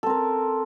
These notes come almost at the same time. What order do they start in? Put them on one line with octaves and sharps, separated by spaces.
A4 C4 A#4